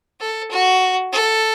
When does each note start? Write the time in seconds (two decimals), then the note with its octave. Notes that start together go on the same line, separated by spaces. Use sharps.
0.20 A4
0.51 F#4
1.13 A4